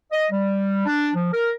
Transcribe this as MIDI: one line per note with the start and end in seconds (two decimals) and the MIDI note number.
0.12 0.25 75
0.31 0.82 55
0.86 1.09 62
1.14 1.29 53
1.33 1.49 70